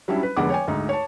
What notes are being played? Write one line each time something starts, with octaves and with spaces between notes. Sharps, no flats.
F#3 G3 C#4 D4 E4
B4
F1 D3 G#3 B3 F#5 D6
C#5 G5 G#5
D2 G#2 D#4
C#5 A5